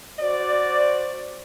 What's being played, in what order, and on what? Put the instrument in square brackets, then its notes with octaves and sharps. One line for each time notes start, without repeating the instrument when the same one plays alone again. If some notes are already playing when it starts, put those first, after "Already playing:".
[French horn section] F#4 C5 D5